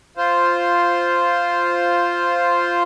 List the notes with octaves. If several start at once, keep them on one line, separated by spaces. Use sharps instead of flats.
F4 C5